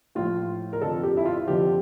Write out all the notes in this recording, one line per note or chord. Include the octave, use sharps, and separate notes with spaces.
A2 F3 F4
A#4
F2 D3 F3 A4
G4
E4
F4
F2 D3 F3 G4